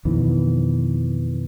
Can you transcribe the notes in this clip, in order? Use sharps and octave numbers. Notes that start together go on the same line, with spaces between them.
F2 B2 D#3 E3